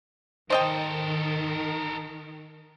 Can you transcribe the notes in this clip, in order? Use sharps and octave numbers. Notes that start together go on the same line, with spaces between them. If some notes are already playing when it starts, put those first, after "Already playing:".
D#3 A4 A#4 C5 D#5 G5